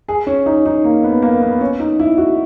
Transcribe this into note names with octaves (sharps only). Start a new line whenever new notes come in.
G#4
C#4
D#4
D#4
A#3
B3
A#3
B3
C#4
D#4
E4
F#4